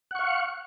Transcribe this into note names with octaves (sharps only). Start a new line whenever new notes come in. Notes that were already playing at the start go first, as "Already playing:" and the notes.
F5 F#5 C#6